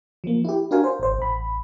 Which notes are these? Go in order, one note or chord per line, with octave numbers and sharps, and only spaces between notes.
F3 A#3
E4 G4
D4 F#4 A#4 F5 G#5
C5
G#1 C5
A1 B5